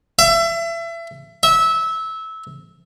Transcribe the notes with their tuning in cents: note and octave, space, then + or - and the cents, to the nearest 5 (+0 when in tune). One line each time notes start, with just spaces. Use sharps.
E5 +30
E5 -20